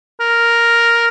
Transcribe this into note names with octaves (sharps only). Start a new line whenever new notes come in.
A#4